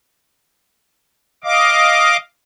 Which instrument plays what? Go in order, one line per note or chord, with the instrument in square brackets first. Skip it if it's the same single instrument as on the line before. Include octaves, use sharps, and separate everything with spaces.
[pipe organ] D#5 F5 D6